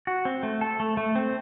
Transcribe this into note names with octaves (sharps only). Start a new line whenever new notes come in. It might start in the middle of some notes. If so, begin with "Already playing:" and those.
F#4
C4
A3
A4
A3
A3
C4